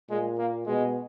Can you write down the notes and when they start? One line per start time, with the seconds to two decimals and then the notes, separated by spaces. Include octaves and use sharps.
0.10 A#2 G#3
0.38 A#3
0.66 B2 G#3